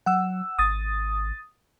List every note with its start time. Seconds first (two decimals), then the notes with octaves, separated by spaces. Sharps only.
0.06 F#3 F#5 E6
0.59 G#1 D#6 A6